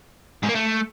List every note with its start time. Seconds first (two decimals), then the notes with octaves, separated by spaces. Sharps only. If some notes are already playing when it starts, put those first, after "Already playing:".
0.43 G#2
0.49 A#3
0.55 A3